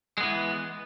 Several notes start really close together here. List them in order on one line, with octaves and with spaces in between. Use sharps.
G#3 B3 E3